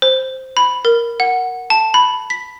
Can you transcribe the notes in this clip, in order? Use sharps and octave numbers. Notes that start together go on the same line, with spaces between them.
C5
B5
A#4
F#5
A5
B5
B6